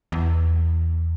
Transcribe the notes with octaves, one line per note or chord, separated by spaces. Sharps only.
E2